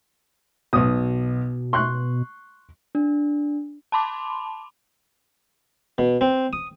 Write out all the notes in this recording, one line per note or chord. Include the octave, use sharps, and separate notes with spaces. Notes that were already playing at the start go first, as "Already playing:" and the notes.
B1 B2 D#6
C6 C#6 F#6
D4
A5 B5 C6 D6
B2
C4
D#6